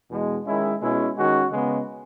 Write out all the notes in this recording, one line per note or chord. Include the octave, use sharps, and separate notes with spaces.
E2 B2 G#3
D#3 G#3 C#4 E4
B2 G#3 C#4 E4
D#3 G#3 C#4 F#4
C#3 G#3 B3